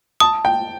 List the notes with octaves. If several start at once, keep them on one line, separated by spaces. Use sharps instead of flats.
A5 D#6
G5